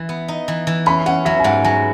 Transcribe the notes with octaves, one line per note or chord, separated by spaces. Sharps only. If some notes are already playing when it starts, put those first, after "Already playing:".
Already playing: E3
B3
D#4
E3
E3
C#4 B5
C#4 F#5
F#3 E5
G#5
G#2 F#5
F#3 G#5